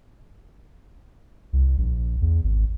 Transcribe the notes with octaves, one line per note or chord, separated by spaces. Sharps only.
C2
A#1
E2
G#1